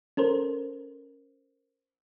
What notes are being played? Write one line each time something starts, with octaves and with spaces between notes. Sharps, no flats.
C#4 A4 A#4 C5